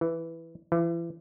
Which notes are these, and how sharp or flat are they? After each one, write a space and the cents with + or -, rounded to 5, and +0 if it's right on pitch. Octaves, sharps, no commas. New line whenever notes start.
E3 +0
E3 +35